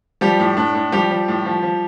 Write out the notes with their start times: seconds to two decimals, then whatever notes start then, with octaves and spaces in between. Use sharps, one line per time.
0.21 F3 G3 G4
0.40 A2
0.57 A2 D4
0.75 A2
0.92 F3 G3 G4
1.10 F3
1.28 A2
1.46 F3
1.62 F3